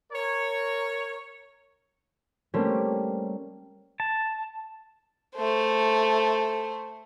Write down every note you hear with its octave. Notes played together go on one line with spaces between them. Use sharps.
A#4 C#5
G3 A3 A#3 C4 C#4 G4
A5
A3 C5